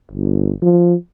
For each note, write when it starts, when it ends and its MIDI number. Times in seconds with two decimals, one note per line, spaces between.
0.11 0.51 31
0.62 0.94 53